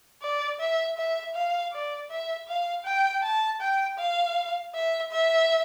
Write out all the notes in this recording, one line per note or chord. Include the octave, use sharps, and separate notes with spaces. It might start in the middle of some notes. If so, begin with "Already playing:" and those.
D5
E5
E5
F5
D5
E5
F5
G5
A5
G5
F5
E5
E5